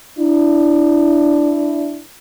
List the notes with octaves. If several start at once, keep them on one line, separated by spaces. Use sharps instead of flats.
D4 E4